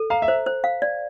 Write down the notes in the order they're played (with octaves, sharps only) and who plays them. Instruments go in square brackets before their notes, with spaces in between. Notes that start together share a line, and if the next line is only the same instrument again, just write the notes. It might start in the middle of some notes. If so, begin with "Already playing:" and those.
Already playing: [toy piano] A4
[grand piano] F5 [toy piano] A#5
[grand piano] E5
[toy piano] C5
C5
F5
D5